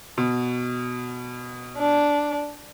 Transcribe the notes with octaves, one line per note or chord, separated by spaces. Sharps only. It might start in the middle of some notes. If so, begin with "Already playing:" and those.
B2
D4